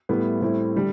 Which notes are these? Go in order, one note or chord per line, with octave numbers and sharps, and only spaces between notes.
A2 G3 B3 E4
A2 G3 C4 E4
D3 G3